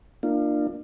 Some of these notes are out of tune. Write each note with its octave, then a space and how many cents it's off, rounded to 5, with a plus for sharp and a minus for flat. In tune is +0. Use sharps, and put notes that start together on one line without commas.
A#3 +0 D4 +35 F4 -10